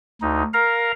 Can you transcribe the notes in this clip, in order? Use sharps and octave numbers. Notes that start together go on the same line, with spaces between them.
D2 D#4
A#4 F5 A#5